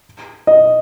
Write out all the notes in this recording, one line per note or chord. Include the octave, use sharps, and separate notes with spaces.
D#5